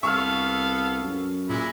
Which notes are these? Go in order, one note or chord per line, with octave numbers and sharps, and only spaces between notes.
C2 B3 A4 F5 C#6 E6 F6
F#2
A#2 G#3 E4